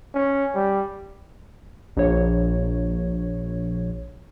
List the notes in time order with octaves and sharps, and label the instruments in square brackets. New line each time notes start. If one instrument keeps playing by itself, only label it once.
[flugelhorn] C#4
G3
[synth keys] A#1 C#5